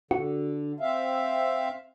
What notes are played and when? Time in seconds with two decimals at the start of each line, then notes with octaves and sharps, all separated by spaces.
0.11 D3 F#4
0.80 C4 E5 F5